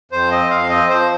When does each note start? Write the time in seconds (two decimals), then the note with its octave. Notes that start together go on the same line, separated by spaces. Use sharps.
0.11 F2 C5
0.31 C4 D#5
0.50 F2 F5
0.69 C4 D#5
0.90 F3 C5